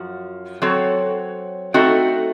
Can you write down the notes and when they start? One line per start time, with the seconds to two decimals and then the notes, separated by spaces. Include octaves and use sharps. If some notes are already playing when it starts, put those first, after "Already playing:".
Already playing: F#2 F3 F#4
0.62 F#3 C4 F#4 A4 C#5
1.74 A3 C4 D#4 F#4 A4